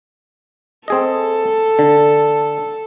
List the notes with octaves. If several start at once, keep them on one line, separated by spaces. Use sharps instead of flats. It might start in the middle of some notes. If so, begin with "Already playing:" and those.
C4 G#4 A4 D#5
D3